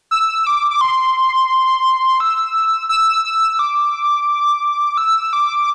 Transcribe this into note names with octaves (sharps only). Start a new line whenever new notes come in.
E6
D6
D6
C6
E6
E6
E6
D6
E6
D6